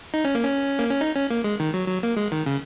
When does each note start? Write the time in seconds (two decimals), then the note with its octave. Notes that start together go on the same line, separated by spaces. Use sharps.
0.14 D#4
0.25 C#4
0.35 A#3
0.45 C#4
0.79 A#3
0.90 C#4
1.01 D#4
1.16 C#4
1.30 A#3
1.44 G#3
1.60 D#3
1.74 F#3
1.88 F#3
2.03 A#3
2.17 G#3
2.32 D#3
2.46 C#3